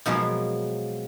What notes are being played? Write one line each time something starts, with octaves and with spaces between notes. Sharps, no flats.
B2 F3 F#3 G#3 A#3